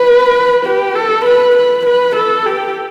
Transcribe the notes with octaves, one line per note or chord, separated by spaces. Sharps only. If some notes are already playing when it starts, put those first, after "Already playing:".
Already playing: B4
G4
A4
B4
B4
B4
A4
G4